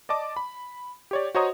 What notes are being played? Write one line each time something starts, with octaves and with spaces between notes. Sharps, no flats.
D5 D#5 A5 D6
B5
G4 C#5 D5
F#4 C5 C#5 D#5 A#5 D#6